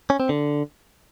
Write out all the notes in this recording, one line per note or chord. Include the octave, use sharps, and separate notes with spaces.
C#4
C4
D3